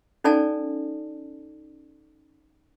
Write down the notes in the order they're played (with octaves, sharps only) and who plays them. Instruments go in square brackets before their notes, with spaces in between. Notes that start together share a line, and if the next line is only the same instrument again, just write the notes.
[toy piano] C#4 D#4 A4 D5 G#5 A5